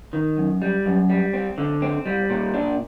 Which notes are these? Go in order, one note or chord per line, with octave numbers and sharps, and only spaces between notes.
D#3
F#2
G3
F#2
G3
C4
D3
C4
G3
A#2
D4